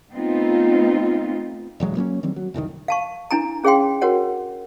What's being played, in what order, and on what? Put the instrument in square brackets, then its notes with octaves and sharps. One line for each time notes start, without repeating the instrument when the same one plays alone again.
[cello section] A3 B3 C4 D#4 F4
[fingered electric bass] E1 A1 F#3 G#3
F#3 A#3 C4 C#4
D#3 F#3 G3 C4
F#3
F1 C2 G#2 D#3
[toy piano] F5 A5 C#6
D4 E4 G#5 A#5
C#4 G#4 C#5 F5 G5 C6
F#4 A#4 C#5 F#5